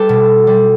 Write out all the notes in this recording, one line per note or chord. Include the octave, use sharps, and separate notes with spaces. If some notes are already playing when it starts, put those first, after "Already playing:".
Already playing: G3 G4 A4 B4
B2
G3